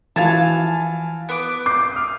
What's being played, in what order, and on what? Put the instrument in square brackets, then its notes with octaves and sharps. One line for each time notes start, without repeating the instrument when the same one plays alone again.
[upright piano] E3 F3 F#4 [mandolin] F5 G#5 A5
[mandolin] B3 D6
[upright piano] D6 C7 [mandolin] G6
[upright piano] D#6 F6